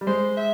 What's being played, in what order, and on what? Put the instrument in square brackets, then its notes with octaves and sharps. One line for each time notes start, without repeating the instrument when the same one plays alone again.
[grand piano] G3
[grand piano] G#3 [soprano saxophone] C5
[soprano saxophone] E5